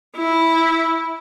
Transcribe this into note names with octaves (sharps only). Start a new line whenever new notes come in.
E4